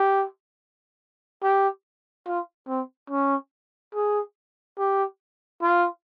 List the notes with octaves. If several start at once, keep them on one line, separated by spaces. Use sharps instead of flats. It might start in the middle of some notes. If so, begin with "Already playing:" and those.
Already playing: G4
G4
F4
C4
C#4
G#4
G4
F4